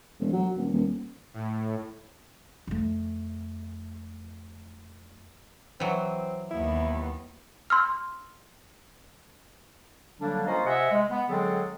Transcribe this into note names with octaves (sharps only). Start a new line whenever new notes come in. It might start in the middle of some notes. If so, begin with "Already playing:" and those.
E1
F#3
D#1
D#1
A2
F2 A3
E3 F#3 C4
D#2 B3 E4
C6 E6 F6
D3 F#3 G3 A#3 D4
A#3 C#4 F4 C5 D#5
C3 C5 D#5 E5 F#5 G#5
G#3
B3
D3 F#3 G#3 C4 G#4 A4